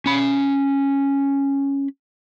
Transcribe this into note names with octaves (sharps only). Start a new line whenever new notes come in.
C#4 B5